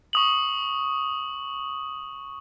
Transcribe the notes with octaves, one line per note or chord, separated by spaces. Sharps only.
C#6 D#6 F#7